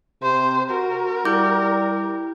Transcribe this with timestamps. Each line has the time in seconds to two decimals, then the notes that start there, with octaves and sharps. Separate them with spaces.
0.22 C3 C5
0.70 F#4 A#4
1.25 G3 E4 D6 G6